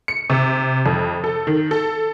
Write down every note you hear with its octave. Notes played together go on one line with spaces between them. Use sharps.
C#7
C3
F2
A4
D#3
A4